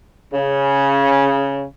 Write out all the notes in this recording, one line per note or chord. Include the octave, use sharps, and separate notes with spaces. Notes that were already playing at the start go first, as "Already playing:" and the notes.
C#3